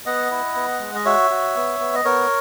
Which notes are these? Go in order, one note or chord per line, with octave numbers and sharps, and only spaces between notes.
B3 D#5 F#5
E4
B3
G#3
D#5
F#4 C#5 E5
F#4
B3
B3
D#5
B3 A#4 C#5